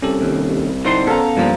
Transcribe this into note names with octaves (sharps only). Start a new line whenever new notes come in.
C2 C#4 G4 A4
D#2
D3 C4 D#4 E4 C5 C6
B3 C#4 A4 F5 A#5
G2 A#2 F3